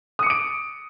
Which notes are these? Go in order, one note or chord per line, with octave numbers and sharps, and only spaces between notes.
D6 D#6 C#7 D7